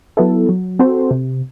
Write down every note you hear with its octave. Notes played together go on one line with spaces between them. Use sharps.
F#3 B3 E4 A4
F#3
C4 F#4 A4 C5
C3